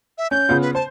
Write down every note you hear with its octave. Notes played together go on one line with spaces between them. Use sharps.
E5
C#4 G6
C#3 B3 F4
B4
C5 A5